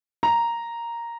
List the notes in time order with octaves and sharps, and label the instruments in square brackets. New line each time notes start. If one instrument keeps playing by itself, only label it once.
[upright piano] A#5